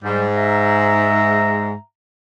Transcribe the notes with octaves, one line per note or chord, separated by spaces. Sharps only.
G#2 G3
E5 A#5